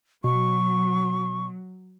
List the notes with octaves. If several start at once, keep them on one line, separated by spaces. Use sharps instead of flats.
B2 F#3 C#6